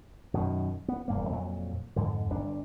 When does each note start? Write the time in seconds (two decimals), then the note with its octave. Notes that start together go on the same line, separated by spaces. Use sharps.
0.34 F#2 B2 D#3
0.88 B3
1.08 E1 G2 A#3
1.30 F2 A#2 F#3
1.96 F2 G#2 D3
2.30 G1 D4